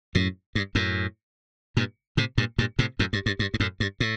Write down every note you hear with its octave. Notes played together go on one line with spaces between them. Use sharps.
F#2 A2
G2
F#2 A2
G2 A#2
A2 C3
G2 A#2
G2 A#2
A2 C3
F#2 A2
G2
G2
G2
G2
F#2 A2
G2
A2